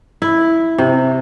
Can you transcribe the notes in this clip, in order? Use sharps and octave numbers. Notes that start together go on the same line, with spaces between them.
E4
C3